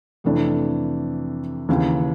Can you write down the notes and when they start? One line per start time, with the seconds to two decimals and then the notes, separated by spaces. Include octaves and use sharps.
0.24 F2 C3 E3 A3 D4
1.69 D#2 C#3 E3